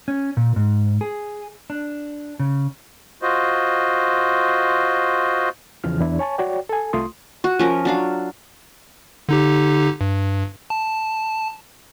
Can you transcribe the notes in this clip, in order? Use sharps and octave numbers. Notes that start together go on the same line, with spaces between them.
C#4
A#2
G#2
G#4
D4
C#3
F4 F#4 C5 D#5
E2 C#3 E3 F3 F6
E2 D4 E4 D5
C#5 G#5 A5 C#6
F#4 C#5 D5 G5
A4 G#5
C2 A3 F4 C6 D#6
F#4
F3 C#4 A#4
F#3 D4 F5
D3 D#4 G4
G2
A5